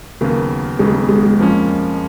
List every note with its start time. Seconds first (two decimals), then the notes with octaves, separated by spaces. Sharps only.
0.21 D#2 C#3 F#3 A#3 B3
0.79 D#2 C#3 F#3 G#3 B3
0.94 G#3
1.09 G#3
1.23 G#3
1.38 F2 F3 A#3 C#4